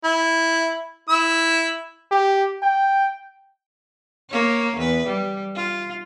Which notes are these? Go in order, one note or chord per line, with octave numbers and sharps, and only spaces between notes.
E4
E4 E6
G4
G5
A#3 C#5
E2 B4
G3
F4